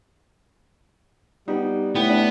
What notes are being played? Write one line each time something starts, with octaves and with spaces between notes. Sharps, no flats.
G3 B3 D#4
A2 B3 G5
D4